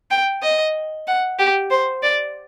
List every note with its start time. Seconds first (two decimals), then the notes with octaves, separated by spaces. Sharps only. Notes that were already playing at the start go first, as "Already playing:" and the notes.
0.11 G5
0.42 D#5
1.07 F#5
1.39 G4
1.71 C5
2.03 D5